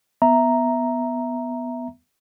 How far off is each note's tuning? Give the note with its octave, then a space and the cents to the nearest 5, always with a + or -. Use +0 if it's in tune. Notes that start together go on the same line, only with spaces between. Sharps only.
B3 +0 E5 +0 A#5 +0